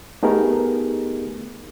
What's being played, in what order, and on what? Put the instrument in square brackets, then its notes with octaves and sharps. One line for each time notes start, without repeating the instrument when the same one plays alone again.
[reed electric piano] A3 B3 D#4 G4 G#4 A#4